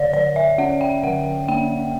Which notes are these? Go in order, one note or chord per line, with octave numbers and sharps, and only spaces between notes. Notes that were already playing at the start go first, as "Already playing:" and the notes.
Already playing: D3 C#5 D5
D3 D5
E5
C#4 F#5
G5
D3 F#5
A#3 G5